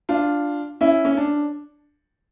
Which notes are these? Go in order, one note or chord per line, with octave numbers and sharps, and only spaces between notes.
D4 F4
C#4 E4
C#4
D4